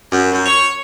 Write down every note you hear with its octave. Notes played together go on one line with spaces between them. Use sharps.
F#2
F#2
C#5